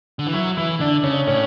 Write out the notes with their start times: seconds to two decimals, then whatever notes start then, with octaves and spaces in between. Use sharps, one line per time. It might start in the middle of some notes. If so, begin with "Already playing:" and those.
0.19 D3
0.27 E3
0.33 F#3 E4
0.57 E3 E4
0.80 D3 D4
1.04 C#3 C#4
1.27 A2 C#4